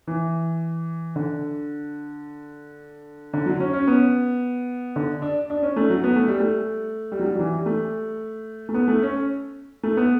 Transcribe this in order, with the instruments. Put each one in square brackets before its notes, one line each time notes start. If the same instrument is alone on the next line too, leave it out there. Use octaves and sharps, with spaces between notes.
[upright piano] E3
D3
D3
F#3
C#4
C#4
B3
D3
D4
D4
C#4
A3
F#3
B3
A3
G3
A3
G3
F#3
G3
F#3
E3
G3
A3
A3
B3
A3
C#4
A3
B3